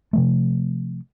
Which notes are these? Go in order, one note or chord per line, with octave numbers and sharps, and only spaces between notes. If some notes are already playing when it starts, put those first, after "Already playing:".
C3 F3 A3